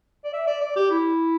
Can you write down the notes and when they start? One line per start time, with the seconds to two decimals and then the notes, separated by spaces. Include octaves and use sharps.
0.24 D5
0.33 E5
0.47 D5
0.61 D5
0.76 G4
0.91 E4